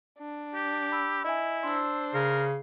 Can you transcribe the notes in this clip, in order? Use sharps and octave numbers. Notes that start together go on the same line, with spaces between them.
D4
G4
B5 E6
E4 D#5 E5 G#5
D4 C5 C6 E6
C#3 A#4 C7